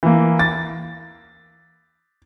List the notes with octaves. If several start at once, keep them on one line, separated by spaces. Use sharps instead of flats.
E3 A#3
A6